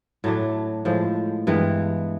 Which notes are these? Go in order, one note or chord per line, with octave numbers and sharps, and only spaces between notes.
A2 F#3 A3 D4
A2 F3 G#3
G2 E3 G#3 B3